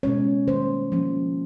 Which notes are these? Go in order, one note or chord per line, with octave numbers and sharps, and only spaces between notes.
B2 G#3 C#4 C#5
D#3 G3 A#3 C#4 C5
F3 A#3 C#4